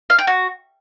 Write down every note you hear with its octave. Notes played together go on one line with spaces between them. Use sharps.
F5
G5
F#4